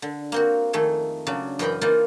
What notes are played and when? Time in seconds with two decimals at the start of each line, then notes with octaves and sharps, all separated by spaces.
0.02 D3
0.32 A#3 C4 F#4
0.73 F2 D#3 A3 G#4
1.27 C#3 F#3 D4
1.59 F#2 E3 A#4 D#5 G5 B5
1.81 E3 A#3 D#4 F4 D5 D#5